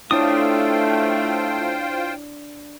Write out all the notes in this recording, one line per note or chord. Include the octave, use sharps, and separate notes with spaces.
A3 D4 E4 F4 C5 C#5 G5 D#6